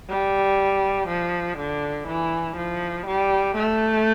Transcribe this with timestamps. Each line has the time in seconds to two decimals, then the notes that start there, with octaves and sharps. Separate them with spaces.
0.09 G3
1.08 F3
1.58 D3
2.08 E3
2.57 F3
3.06 G3
3.56 A3